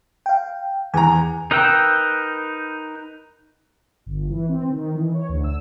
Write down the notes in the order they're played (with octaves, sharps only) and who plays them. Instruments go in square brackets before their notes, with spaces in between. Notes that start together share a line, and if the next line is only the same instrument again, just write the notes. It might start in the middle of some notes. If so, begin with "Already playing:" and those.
[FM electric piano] F5 G5
[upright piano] E2 A#5 [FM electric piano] G#5
[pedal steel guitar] D#4 A#4 B4 G5 E6
[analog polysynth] G1
E3
C4
D#3
E3
C#5
D2
E6